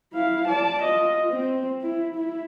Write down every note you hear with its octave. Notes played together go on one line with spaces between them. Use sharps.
E4 F5
D5 A5
F4 D#5
C4
E4
E4